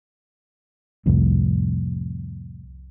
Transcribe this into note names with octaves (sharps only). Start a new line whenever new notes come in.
C2 F2 A2